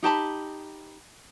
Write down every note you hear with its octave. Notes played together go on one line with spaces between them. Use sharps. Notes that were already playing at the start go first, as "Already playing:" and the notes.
D#4 G4 A5 B5